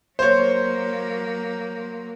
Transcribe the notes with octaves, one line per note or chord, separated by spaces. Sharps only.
F#3 A#3 C5 C#5